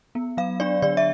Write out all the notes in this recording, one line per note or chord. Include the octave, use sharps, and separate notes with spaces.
B3
F#3 F5
D4 D5
D3 D5
E5